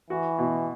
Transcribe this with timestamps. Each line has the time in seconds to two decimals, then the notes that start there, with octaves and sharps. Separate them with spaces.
0.10 E3 F#4
0.38 B2